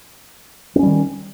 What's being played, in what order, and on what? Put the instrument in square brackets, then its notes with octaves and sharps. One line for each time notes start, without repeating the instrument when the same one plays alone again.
[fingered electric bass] C4
C#4
G3
D#3